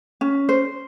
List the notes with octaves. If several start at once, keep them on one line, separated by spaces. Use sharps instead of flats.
C#4
C5